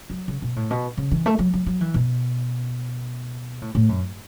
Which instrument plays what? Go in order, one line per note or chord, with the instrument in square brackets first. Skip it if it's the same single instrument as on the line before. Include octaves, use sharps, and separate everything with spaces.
[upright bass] F#3
C#3
B2
A2
B2
C#3
E3
A3
F#3
F#3
F#3
E3
B2
A2
A2
F#2